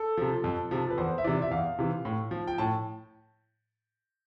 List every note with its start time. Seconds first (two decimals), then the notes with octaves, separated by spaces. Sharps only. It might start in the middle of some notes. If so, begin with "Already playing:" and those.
Already playing: A4
0.17 C3 F3
0.44 F2
0.71 C3 F3
0.90 B4
0.98 E2 C5
1.18 E5
1.24 C3 E3 D5
1.42 E5
1.51 E2 F5
1.79 C3 E3
2.05 A2
2.31 F3
2.48 G5
2.58 A2 A5